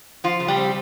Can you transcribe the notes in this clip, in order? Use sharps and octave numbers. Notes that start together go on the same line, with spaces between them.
F3 F4
C#3
G3 G4
C4